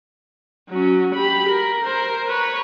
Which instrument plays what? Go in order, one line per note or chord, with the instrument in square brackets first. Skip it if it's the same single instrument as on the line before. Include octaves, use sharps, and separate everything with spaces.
[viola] F#3 C#4
G4 B5
A#4
A#4 C5
B4 C#5